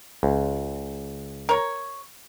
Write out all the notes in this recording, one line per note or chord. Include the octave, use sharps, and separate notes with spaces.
C#2
A#4 C#5